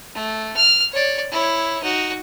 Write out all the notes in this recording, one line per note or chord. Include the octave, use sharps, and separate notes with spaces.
A3
F6
C#5 D5
E4 C#5
D#4 F#4